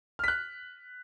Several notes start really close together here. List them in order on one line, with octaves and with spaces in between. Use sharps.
F6 B6 F#6